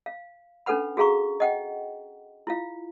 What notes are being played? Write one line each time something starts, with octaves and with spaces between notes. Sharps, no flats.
F5
C#4 D4 A4 B4 F#5 B5
F#4 G#4 F5 A#5 C#6
D#5 F#5 G5
E4 F4 F5